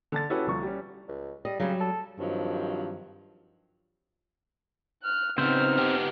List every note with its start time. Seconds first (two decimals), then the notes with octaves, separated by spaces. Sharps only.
0.12 D3 A5 A6
0.30 C#4 E4 F#4 G4 A4 B4
0.47 C2 D3 F3 C#6
0.63 G3 C#4
1.08 C#2
1.45 G3 D#5
1.60 C#3 F#3 G3
1.81 A4
2.19 G2 D#3 F3 F#3 C4
5.03 F6 F#6
5.38 C#3 B3 C4 D#4 C5 F6
5.78 B3 G4